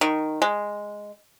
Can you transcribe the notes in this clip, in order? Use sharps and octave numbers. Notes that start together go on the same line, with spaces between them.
D#3
G#3